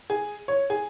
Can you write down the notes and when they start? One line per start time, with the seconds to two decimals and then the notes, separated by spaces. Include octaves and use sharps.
0.10 G#4
0.48 C#5
0.70 G#4